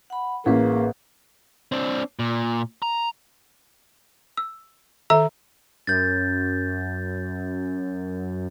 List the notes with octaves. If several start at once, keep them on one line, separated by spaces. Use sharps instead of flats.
F#5 B5
A1 A#3 G#4 B4
C4 D4
A#2
A#5
E6
D#3 A4 E5 A#5 E6
F#2 G6 A6